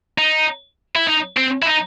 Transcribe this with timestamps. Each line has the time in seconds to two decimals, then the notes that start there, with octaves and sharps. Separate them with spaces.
0.18 D#4
0.96 E4
1.07 D#4
1.37 C4
1.63 E4
1.67 D#4